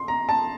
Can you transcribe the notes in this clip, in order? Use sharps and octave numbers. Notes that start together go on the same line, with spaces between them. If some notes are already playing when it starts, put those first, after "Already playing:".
Already playing: C6
A#5
A5